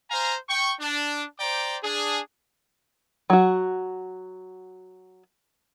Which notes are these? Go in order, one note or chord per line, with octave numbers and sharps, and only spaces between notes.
C5 F5 G#5 A#5
G5 C#6
D4
C5 D5 G5 A#5 D6
D4 G#4
F#3 F#4